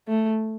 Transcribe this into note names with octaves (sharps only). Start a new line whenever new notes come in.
A3